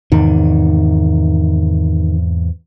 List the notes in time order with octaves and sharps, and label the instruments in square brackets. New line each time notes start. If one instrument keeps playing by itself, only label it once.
[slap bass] E2 G#2 C3 [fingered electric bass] D#3